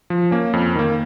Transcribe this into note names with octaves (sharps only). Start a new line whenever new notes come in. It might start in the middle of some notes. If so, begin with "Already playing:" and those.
F3
A#3 C#4
F2
D#3 A#3